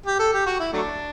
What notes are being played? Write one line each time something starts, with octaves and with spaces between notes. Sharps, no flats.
G4
A4
G4
F#4
E4
F#3 A3 D4